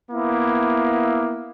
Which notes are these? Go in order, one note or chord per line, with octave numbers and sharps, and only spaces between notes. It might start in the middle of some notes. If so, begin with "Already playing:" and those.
A#3 B3 E4